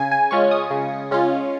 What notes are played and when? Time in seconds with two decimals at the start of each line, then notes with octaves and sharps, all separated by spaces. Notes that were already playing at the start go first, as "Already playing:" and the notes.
Already playing: C#3 G#5
0.12 G#5
0.31 G#3 C#4 F4 C#6
0.51 D#6
0.71 C#3
1.11 G#3 C#4 F4